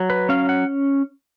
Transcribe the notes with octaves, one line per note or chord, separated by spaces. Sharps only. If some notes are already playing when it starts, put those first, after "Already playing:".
Already playing: F#3
B4
C#4 F5
F#5